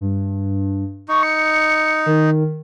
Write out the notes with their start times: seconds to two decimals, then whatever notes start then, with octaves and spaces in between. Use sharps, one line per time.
0.01 G2
1.08 D#4 C#6
1.23 C#7
2.06 D#3